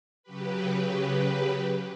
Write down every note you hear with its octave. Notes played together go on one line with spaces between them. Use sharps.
C#3 F#3 G4 B4